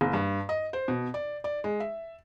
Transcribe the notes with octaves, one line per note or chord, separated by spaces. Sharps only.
F#1
G2
D#5
C5
B2
D5
D5
G#3
E5